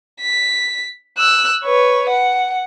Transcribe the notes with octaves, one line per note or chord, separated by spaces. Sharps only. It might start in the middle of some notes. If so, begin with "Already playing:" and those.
B6
E6 F#6
B4 C#5
F#5